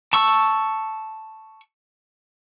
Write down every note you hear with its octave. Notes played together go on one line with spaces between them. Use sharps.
A5 C#6 E6